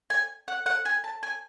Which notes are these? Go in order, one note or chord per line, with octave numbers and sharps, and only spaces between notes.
G#5
F#5
F#5
G#5
A5
G#5